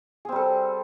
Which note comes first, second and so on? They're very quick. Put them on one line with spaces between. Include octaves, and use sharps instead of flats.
G#4 C4 G3 A4